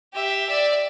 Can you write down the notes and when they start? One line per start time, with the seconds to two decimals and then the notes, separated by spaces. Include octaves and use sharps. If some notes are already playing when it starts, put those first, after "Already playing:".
0.13 G4 E5
0.49 D5 E5